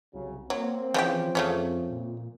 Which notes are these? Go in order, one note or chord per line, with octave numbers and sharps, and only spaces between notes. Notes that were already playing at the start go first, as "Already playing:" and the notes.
C2 C#3 F#3
F#3 A#3 C4
C#3 E3 F3 F4 G4
F2 C#3 A3 C#4
A#2